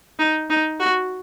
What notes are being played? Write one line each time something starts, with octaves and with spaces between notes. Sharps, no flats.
D#4
D#4
F#4